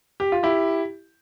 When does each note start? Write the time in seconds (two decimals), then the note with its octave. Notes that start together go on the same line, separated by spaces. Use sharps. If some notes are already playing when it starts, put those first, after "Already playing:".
0.20 G4
0.32 F4
0.43 E4 G4